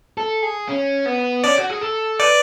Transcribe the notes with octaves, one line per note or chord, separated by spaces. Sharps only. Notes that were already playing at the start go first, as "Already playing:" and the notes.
A4
G#4
C#4
B3
C#4 D5
F#4
G#4
A4
B4 D5